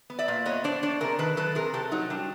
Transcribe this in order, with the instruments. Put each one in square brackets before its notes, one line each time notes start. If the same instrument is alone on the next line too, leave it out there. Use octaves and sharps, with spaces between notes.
[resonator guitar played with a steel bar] B3
D5 E5
A#2
B3 C#5 D#5
D4 C5 D5
D4 C5 D5
C3 G#4 A#4
D#3 A4 B4
F#3 A4 B4
C3 G#4 A#4
C3 G4 A4
F#3 D#4
G3 D4